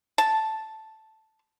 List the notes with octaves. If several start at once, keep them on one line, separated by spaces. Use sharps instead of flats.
A5